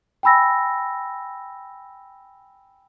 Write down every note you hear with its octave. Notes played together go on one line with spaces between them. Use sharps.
G5 G#5 B5 E6 A#6